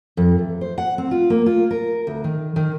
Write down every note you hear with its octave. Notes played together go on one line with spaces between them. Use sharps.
F2
E2
C5
F#5
C4
F4
A#3
F4
A#4
D2
D#3
D#3